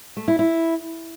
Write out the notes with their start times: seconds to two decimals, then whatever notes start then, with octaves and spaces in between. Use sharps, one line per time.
0.17 A3
0.28 E4
0.39 E4